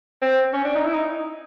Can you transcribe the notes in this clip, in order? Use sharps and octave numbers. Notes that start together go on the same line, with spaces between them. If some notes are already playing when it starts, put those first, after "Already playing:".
C4
C#4
D4
D#4
E4
D#4